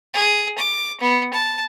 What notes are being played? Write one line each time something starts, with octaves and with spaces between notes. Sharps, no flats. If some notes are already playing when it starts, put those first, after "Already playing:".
G#4
D6
B3
A5